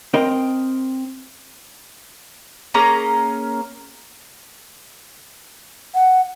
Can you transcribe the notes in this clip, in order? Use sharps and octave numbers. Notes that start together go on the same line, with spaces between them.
C4 A#4 D#5
A#3 C#4 G#4 A#5
F#5